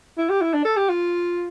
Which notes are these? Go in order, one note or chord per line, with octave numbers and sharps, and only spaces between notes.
E4
G4
E4
D4
A4
G4
F4